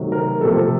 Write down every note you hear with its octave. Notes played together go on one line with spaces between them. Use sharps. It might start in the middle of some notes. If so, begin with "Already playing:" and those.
Already playing: C3 D#3 F#3 A3
A#4
C3 F3 A3 A4